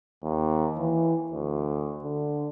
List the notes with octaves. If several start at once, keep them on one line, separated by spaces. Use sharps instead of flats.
D#2
E3
D2
D3